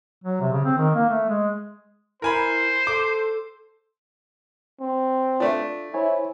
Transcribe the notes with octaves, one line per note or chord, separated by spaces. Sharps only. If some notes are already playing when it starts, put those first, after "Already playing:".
F#3
C3
C#3
C4
D#3
A#3
A3
G#3
E4 A#4 C5 G#5 B5
A4 D6
C4
A3 D4 F4
E4 C5 C#5 G#5